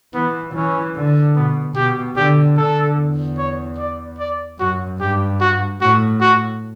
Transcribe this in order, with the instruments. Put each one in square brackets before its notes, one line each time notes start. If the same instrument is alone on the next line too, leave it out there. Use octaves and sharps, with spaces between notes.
[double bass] E3 [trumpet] B3
[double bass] E3 [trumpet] C#4
[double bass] D3
[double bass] B2 [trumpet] B3
[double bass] B2 [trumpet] G4
[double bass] D3 [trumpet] G4
[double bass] D3 [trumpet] A4
[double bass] E2
[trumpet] C#5
D5
D5
[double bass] F#2 [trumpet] F#4
[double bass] G2 [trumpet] G4
[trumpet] F#4
[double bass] A2 [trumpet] F#4
[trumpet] F#4